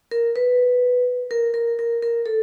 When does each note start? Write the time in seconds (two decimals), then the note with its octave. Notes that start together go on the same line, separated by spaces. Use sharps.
0.11 A#4
0.36 B4
1.31 A#4
1.54 A#4
1.79 A#4
2.02 A#4
2.26 A4